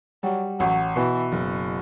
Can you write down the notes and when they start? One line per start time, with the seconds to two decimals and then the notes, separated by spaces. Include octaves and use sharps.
0.23 F#3 G3
0.60 A1 F#3
0.96 B2 E3
1.32 F#1